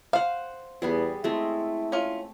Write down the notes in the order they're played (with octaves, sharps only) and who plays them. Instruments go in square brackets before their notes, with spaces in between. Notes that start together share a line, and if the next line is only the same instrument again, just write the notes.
[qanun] C5 F#5 [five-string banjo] F5
[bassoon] E2 [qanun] G3 B3 G#4
[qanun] G#3 A3 C4 [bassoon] E4
[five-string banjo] C#4 F4